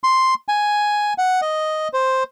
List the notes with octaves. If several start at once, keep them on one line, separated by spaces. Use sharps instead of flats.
C6
G#5
F#5
D#5
C5